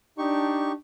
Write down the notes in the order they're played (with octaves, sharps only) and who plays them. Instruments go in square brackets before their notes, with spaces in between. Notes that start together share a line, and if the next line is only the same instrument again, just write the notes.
[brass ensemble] D4 [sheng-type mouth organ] D#4 G4 C#6